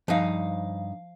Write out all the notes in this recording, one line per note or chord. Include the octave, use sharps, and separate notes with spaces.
G2 F3 D#4 F5